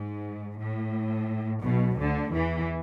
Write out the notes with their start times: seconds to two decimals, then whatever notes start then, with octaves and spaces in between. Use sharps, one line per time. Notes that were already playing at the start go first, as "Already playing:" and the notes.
Already playing: G#2
0.59 A2
1.62 B1 B2
1.96 D2 D3
2.31 E2 E3